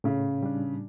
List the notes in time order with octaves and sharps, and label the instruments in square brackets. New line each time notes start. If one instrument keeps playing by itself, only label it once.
[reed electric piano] A2 [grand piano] C#3
[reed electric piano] G3 D4